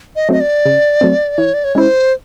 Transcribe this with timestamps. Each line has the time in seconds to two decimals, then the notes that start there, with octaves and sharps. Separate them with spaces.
0.16 D#5
0.29 F#3 A3 C4 D#5
0.40 D5
0.65 C#3
1.01 F#3 A3 C4
1.38 E3 C#5
1.54 D5
1.64 C#5
1.75 G#3 C#4 E4 C5 C#5